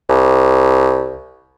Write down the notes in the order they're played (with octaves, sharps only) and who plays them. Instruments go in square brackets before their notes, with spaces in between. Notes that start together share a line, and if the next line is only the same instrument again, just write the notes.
[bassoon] C2